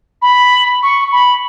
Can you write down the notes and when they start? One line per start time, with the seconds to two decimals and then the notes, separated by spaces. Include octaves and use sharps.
0.22 B5
0.83 C#6
1.12 B5